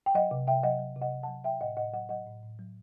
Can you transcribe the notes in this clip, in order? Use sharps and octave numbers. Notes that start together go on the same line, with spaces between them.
G5
F#3 D#5 F#5
C3
C3 E5 G5
F#3 D#5 F#5
F#3
C3
D#5 F#5
C3
F#5 A5
F#3
F#3 E5 G5
A2 D#5 F#5
A2 D#5 F#5
F#3 D#5 F#5
F#3 D#5 F#5
A2
A2
F#3